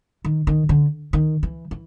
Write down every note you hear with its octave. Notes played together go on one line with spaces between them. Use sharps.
D#3
D#3
D3
D#3
E3
E3